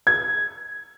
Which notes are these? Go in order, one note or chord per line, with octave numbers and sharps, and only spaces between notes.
G#6